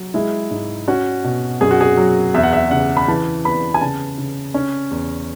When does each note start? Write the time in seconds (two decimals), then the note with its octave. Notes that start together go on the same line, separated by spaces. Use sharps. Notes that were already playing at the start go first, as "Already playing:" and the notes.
Already playing: F#3
0.14 G#3 E4
0.51 G#2
0.88 C#4 F#4
1.24 B2
1.61 F#2 G#4
1.71 F#4
1.81 G#4
1.97 F#3
2.34 E2 E5
2.43 F#5
2.53 E5
2.71 C#3 F#5
2.97 B5
3.08 E3 A5
3.45 B3 B5
3.74 G#5
3.81 C#3 A5
4.18 C#3
4.54 C#4
4.91 E2